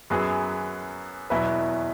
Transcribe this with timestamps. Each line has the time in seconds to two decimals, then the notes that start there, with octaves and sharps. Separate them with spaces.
0.10 F#2 F#3 B3 G#4
1.30 E2 B2 F#3 E4 B4